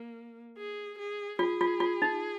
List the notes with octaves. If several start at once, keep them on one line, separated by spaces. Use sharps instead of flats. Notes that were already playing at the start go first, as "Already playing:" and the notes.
Already playing: A#3
G#4
G#4
F4 G#4
F4
F4
D#4